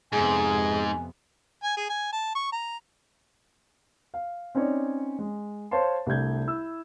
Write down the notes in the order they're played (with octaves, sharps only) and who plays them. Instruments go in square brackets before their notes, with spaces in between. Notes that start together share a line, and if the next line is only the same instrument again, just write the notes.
[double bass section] F2 C3 B3 [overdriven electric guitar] G#2 [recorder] G#4 [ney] G#5
[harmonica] G#5
G#4
G#5
A5
C#6
A#5
[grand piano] F5
C4 C#4 D#4 C#5 D5
G#3
C5 C#5 F5 A5 C6
C2 G3 A3 D4 G6 G#6
E4 E6